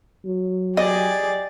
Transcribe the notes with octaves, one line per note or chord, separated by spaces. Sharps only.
F#3
G4 G#4 D5 D#5